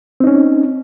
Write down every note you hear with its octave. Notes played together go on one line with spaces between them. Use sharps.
C4 C#4 D#4